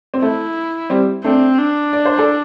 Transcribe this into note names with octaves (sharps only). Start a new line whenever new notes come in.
C4
A3 E4
G3 C4
A3 C4 D4
D4
D5
C5
A4 D5